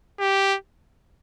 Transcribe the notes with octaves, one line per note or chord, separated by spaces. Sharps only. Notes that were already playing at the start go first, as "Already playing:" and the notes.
G4